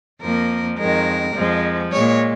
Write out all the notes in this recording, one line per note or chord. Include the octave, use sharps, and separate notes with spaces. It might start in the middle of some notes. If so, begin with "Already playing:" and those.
F2 F3 A#3 A#4
F2 D#3 G#3 A#4
F2 F3 G#3
A#2 G#3 C#5